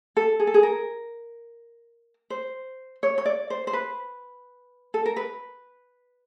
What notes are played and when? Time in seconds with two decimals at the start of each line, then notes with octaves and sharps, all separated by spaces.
0.17 A4
0.40 G#4
0.47 A4
0.54 G#4
0.63 A#4
2.30 C5
3.03 C#5
3.18 C#5
3.26 D5
3.50 C5
3.67 C5
3.73 B4
4.94 A4
5.06 A#4
5.16 B4